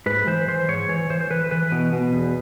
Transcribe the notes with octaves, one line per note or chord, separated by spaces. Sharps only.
G#2 B4
E3 C5
E3 C5
G#2 C#5
E3 C#5
E3 C5
C5
E3 B4
E3 B4
B2
B2
E2